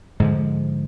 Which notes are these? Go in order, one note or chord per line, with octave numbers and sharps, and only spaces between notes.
G#2 D3 F3